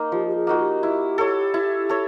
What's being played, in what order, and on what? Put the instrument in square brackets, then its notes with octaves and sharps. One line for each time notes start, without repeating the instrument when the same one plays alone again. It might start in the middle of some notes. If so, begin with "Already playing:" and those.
Already playing: [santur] A#3 D#4
[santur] F3 [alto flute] G4
[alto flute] G4
G#4
[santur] A#3 D#4 F#4
[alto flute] G4
[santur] E4
A4 C#5
E4
A4 C#5